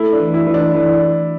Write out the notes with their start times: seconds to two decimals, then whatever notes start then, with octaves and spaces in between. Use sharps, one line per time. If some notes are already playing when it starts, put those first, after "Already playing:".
Already playing: A3 E4
0.12 D4
0.20 E3
0.34 E4
0.47 E3
0.54 D4
0.75 E3